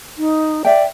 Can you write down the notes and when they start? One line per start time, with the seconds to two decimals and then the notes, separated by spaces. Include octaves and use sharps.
0.17 D#4
0.65 D5 E5 G5